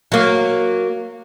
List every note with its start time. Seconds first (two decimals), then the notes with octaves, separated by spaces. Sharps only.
0.12 F#3 A#3